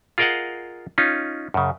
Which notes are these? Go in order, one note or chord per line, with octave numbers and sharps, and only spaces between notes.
F4 G#4 A#4 D#5 F5 F#5
C#4 D#4 F4
F#2 C#3